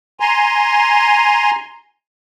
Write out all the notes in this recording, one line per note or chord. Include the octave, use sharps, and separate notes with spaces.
G#5 A#5 C6